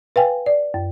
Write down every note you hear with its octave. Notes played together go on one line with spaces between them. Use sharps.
B4 F5 G5 G#5
D5
F#2